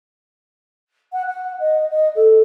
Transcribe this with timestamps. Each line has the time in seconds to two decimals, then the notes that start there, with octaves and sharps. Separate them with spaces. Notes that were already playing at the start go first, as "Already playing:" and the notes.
1.13 F#5
1.27 F#5
1.60 D#5
1.90 D#5
2.15 A4